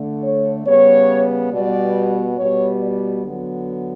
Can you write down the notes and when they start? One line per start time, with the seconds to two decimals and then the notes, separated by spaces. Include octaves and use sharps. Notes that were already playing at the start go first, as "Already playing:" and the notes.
Already playing: D3 A3
0.22 C#5
0.65 C#3 G3 B3 C#5
1.52 B2 G3 B3 D5
2.37 B2 G3 B3 C#5
2.82 D5
3.24 D3 F#3 B3